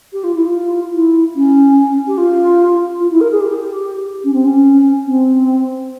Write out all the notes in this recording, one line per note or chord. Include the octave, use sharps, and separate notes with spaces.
G4
F4
E4
F4
E4
C#4
G4
F4
F4
E4
A#4
G#4
G4
C#4
C4
C#4
C4